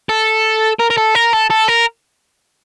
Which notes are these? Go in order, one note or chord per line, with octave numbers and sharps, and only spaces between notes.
A4
A#4
A#4
A4
A#4
A4
A4
A#4